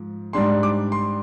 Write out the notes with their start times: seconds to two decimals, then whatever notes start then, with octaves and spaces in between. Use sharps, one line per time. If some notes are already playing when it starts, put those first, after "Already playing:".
Already playing: G#2 F3
0.33 G#2 G3 D4 C6
0.63 D6
0.92 C6